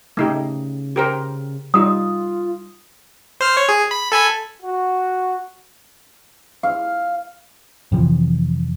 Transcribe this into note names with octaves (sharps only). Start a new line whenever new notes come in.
C#3 A3 D#4 G4
G4 A#4 C5
G3 D#4 F4 D#6
C5 F6
C#5
G#4
B5
A4 G#5 B5
F#4
F5
F2 C3 E3 F3